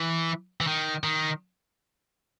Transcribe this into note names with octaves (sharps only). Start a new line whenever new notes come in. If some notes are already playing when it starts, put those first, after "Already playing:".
Already playing: E3
E3
D#3
D#3